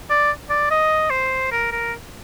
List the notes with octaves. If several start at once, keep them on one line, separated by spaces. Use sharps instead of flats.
D5
D5
D#5
C5
A#4
A#4